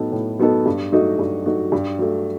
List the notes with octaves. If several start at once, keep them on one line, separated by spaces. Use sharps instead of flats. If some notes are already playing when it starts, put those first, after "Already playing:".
Already playing: A2 F#3 B3 D#4 A4
A2
F#3 B3 D#4 A4
G2
F#3 A3 D#4 F#4
G2
F#3 A3 D#4 F#4
G2
F#3 A3